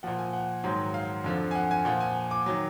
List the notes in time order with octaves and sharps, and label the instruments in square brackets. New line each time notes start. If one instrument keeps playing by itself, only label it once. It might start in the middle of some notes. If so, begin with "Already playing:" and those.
[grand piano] A#2 F3 F#5
G#5
F#5
G#2 D#3 F#3
F5
F2 D3 F3
G#5
F#5
G#5
A#2 F3 F#5
G#5
D6
D#3 F#3